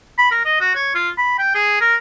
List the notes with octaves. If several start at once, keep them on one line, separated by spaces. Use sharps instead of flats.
B5
A#4
D#5
F#4
C#5
F4
B5
G5
G#4
A#4